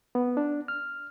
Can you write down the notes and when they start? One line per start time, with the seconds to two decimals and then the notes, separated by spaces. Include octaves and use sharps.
0.15 B3
0.37 D4
0.68 F6